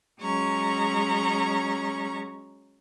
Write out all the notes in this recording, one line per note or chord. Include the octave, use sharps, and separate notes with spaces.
F#3 G#3 C#4 A#5 C#6